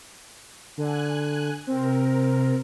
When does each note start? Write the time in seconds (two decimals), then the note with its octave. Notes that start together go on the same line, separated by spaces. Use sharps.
0.77 D3 G#5 F#6
1.67 C3 C4 A#4